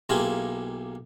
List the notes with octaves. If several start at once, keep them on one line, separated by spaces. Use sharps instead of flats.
B1 A#3 E4 F4 G4 G#4